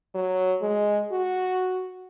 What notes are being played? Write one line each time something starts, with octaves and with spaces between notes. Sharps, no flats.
F#3
G#3
F#4